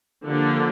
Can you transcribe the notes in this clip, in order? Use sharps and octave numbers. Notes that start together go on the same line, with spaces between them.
D3 F3 A#3 D4 G4